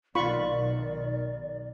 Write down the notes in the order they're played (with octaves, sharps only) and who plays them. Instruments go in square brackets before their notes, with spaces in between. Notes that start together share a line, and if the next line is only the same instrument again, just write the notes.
[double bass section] B1 D#3 [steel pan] F4 B5 C#6 [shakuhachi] D5